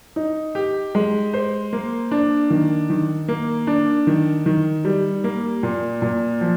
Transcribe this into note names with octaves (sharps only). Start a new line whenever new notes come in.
D#4
G4
G#3
C5
A#3
D4
D#3
D#3
A#3
D4
D#3
D#3
G3
A#3
A#2
A#2
F3